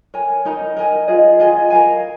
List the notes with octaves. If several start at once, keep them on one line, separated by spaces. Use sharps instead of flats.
A#4 C#5 G#5
D#4 A#4 D#5 A#5
A#4 D#5 G#5
F4 G#4 D#5
F4 G#4 D#5 G#5
A#4 F5 G#5